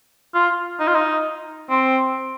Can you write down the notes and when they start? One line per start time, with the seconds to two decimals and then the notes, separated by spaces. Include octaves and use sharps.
0.35 F4
0.80 D#4
0.88 F4
0.95 D#4
1.70 C4